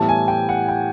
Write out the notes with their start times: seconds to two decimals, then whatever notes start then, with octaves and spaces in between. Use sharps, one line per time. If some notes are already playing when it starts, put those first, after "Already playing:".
Already playing: A2 E3 G3 B3 A5
0.09 G#5
0.28 G5
0.49 F#5
0.68 G5